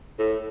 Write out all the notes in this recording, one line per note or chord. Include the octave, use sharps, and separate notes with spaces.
A2